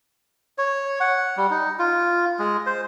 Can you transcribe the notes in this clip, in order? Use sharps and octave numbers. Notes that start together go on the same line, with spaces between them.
C#5
F#5
G3
D#4
F4
G#3
C5